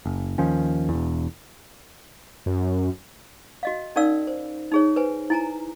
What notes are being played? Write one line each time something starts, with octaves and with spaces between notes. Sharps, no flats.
F#1
D#2 D#3 F3 C#4
E1 E2
F#2
F#4 D#5 F5
C#4 D#4 A#4 D5 F5 E6
C5
D#4 G#4 C#5
B4 C5 G#5
E4 G#5 A#5